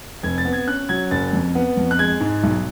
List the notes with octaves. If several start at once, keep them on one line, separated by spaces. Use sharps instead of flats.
F1 G#6
A6
B3
G#6
C#4 F#6
F#3 G#6
F#1 A6
F2
B3
F2
F#6
G#3 G#6
G#2
B1